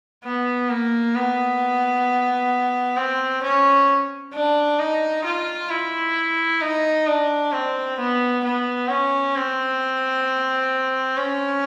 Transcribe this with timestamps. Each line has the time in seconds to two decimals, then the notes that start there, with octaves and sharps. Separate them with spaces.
0.24 B3
0.69 A#3
1.15 B3
2.97 C4
3.43 C#4
4.33 D4
4.79 D#4
5.25 F4
5.70 E4
6.61 D#4
7.07 D4
7.53 C4
7.98 B3
8.44 B3
8.89 C#4
9.35 C4
11.17 C#4